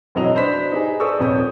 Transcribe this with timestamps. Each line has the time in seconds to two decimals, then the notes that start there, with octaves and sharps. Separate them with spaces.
0.15 E1 F2 F#3 E4 D#5 F7
0.35 D4 C5 B5 B6
0.72 D#4 G4 G#4
1.00 A4 C5 D5 C#6 D#6 E6
1.19 D#1 F2 C#5 D#6 G6